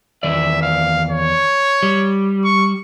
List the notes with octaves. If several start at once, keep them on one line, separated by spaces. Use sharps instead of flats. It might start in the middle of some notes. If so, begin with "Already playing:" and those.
E2 D#3 D5 E5
F5
C#5
G3
C#6